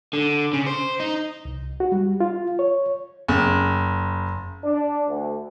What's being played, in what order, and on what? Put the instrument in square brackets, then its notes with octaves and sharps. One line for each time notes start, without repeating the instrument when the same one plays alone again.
[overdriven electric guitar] D3
C#3
C5
D#4
[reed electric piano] C2
F#4
G3
F4
C#5
[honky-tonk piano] F#1
[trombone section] D4
D2